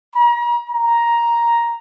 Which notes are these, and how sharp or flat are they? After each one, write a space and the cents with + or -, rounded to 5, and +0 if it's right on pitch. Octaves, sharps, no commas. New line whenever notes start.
A#5 +40
A#5 +5